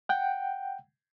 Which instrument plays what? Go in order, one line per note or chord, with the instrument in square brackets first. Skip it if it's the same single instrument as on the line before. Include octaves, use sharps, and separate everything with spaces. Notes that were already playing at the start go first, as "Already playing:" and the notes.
[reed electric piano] F#5 G5